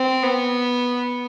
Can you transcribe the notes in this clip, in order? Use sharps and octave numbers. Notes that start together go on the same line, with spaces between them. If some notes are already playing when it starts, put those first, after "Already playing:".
Already playing: C4
B3